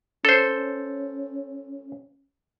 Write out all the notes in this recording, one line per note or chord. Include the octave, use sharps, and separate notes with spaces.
C#4 A4 C5